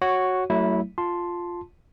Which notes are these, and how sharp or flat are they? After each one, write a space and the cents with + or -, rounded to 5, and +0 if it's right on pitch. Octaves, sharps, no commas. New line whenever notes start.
F#4 +0 C#5 -10
F#3 +25 A3 +15 E4 -15
F4 +0 A5 +0 C6 +0